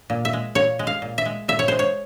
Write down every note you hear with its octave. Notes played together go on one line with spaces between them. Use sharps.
A#2
E5
G#3
A#2 C#5
G#3
F5
A#2
E5
G#3
A#2 E5
C#5
G#3 C5
C#5